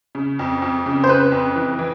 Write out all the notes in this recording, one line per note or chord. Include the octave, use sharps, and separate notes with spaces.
C#3
F2
F2
C#3
C5
C#3 B4
F2
E3
E3